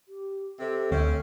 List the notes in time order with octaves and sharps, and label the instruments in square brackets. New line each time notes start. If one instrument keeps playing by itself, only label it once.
[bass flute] G4
[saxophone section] C3 [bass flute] A4
[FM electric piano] D2 [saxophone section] C4 C#4